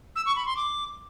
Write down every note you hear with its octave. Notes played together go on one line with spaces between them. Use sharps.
E6
C#6
B5
C6
D6